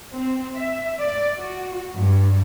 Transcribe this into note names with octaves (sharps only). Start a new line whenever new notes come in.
C4
E5
D5
F#4
G2